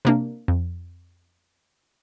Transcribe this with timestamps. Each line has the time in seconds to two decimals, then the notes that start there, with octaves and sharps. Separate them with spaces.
0.05 C3 A#3 D4
0.48 F2